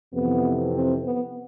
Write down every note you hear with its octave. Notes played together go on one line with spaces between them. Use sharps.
F2 C3 E3 B3
C4
B3